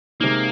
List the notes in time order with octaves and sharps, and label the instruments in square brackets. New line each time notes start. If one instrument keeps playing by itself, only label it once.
[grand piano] C3 G#3 D#4 [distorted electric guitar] A#3